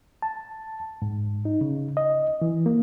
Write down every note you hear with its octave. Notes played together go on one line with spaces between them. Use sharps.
A5
G#2
D#4
C#3
D#5
E3
A#3